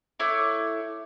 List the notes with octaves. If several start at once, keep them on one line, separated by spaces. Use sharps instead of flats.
A3 E4 C#5 D6